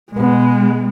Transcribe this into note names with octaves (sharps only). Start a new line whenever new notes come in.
B2 G#3 B3